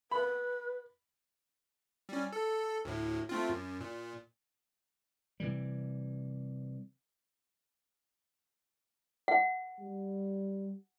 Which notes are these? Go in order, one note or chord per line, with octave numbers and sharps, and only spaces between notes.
B4 B5
G3 C#4
A4
D2 A2
A3 C4 F4
F#2
A#2
C3 E3 G3
F#5
G3